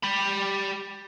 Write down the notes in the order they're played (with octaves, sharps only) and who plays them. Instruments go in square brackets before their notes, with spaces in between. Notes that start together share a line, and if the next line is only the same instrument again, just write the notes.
[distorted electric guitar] G4 B5